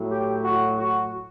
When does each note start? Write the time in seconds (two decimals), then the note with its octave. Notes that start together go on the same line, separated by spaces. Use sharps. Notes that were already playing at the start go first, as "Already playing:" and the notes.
Already playing: A2 F#3
0.10 G4
0.44 F#4
0.79 F#4